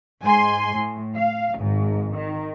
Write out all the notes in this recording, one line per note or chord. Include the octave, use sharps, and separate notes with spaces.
G#2 G#5 C6
A2
F5
G#1 G#2
D#3